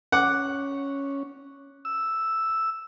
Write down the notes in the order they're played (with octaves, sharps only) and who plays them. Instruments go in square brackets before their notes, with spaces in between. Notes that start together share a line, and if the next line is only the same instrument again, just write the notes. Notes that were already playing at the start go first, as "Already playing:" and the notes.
[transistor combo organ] C#4 [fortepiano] F#5 D6
[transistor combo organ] E6